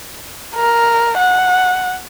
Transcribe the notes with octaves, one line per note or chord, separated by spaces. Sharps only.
A#4
F#5